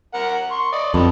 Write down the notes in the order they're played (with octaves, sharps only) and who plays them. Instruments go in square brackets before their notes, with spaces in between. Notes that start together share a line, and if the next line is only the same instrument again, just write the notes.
[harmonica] A#4 F#5
C6 C#6
D5 D#5
[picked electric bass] F2 [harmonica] A4 B4 D#5